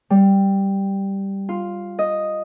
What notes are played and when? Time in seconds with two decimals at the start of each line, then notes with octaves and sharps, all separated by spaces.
0.10 G3
1.49 F4
1.99 D#5